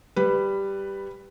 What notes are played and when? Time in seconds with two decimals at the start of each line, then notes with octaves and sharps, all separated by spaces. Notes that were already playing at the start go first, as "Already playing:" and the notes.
0.16 G3 B4